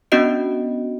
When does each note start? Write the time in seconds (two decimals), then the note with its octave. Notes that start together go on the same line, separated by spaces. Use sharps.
0.12 B3 C#4 D4 F#4 D#5 D7